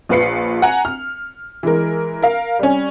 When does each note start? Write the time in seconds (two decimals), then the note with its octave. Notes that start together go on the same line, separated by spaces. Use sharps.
0.09 A#1 F4 B4 C7 C#7
0.62 F#5 G#5 A#5
0.85 F6
1.63 E3 G#3 A#4
2.22 A#4 F5
2.59 G3 C#4